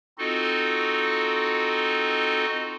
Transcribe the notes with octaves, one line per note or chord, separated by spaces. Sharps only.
C4 D#4 F4 F#4 A4 D#5